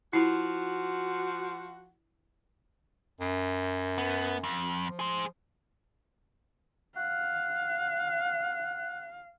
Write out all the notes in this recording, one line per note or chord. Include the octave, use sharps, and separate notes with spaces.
F3 E4 F#4
F#2
B3
F2
F3
G#4 C5
F5 F#5